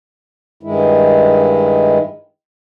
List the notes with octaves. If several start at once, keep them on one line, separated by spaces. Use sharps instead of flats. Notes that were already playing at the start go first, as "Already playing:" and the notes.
G2 D#3 G#3 E4